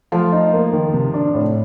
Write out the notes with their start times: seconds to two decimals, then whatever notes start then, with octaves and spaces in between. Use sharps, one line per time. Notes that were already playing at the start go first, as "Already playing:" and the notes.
0.12 F3 A3 F4
0.32 D#4
0.53 A#3
0.73 D#3
0.93 C3
1.14 D4
1.34 A2